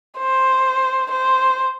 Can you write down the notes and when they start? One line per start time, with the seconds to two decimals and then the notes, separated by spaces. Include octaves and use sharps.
0.18 C5
1.11 C5